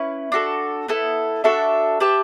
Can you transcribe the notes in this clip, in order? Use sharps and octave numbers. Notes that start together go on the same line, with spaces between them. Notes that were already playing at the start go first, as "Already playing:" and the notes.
Already playing: C#4 E4 B4
D4 F#4 A4
B3 E4 A4
D4 F#4 A4 E5
G4 B4 E5 A5